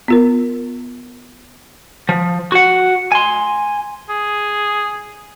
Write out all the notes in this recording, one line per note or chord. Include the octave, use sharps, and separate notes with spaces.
B3 F4 A#4
F3
F#4 F#5
G#5 C6
G#4